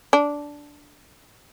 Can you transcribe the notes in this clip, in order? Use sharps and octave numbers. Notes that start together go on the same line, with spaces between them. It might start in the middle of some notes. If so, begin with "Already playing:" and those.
D4